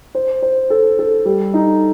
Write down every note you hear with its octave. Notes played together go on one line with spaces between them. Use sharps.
C5
C5
A4
A4
G3
D#4